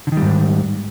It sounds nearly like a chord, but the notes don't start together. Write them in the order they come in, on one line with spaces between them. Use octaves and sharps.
D3 D#3 G3 G#2